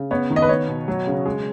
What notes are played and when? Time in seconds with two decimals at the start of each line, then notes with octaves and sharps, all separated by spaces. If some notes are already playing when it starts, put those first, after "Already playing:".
Already playing: C#3
0.11 B3 C#5
0.30 D#3
0.36 D#5
0.42 B4
0.49 B3 C#5
0.68 B2
0.88 F#3
1.07 C#3
1.25 G#3